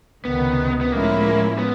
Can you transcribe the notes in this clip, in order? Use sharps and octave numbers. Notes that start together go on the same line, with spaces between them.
C#2 C3 D#3 B3
B3
A2 F3 G#3 A#3 C#4 E4
B3